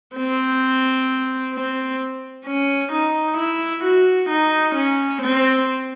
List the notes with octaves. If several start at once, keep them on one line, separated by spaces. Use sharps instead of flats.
C4
C4
C#4
D#4
E4
F#4
D#4
C#4
C4